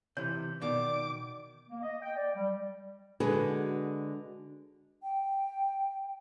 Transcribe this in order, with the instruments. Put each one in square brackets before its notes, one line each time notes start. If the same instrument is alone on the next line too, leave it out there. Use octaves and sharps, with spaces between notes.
[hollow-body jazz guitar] C3 E3 [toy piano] C#5
[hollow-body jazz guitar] B2 D#3 [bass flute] D5 [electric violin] D6
[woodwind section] A#3
D#5
G5
D5
G3
[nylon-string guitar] D3 G#3 F#4 G#4 B4
[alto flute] G5